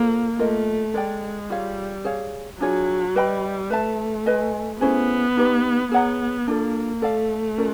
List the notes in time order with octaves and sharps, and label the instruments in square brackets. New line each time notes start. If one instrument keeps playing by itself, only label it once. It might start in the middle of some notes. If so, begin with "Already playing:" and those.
Already playing: [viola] A#3 [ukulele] F4 A4 C5
[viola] A3 [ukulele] F4 A#4 D#5
[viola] G#3 [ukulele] A4 D5 G5
[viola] G3 [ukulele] F4 G#4 C#5 F5
[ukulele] G#4 C#5 F5
[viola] F#3 [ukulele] D4 F4 G#4 C#5
[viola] G3 [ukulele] B4 D#5 G5 B5
[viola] A3 [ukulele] B4 E5 A5
[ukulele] B4 D#5 G#5
[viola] B3 [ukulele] C#4 E4 G#4 C5
[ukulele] D#4 G4 B4
[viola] B3 [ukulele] G#4 C#5 F#5 A#5
[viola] A#3 [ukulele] D4 F4 A4
[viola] A3 [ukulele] A4 D5 F5 A5
[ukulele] C#4 F4 A#4 D5